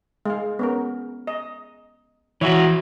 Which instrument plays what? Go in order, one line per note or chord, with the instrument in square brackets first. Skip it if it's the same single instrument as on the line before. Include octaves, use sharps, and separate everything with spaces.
[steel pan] G#3 F5
B3 C#4 A#4
D#5
[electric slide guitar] E3 F#4 [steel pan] C#5 E5